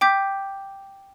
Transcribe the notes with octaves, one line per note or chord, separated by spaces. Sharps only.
G5 D6 G6 B6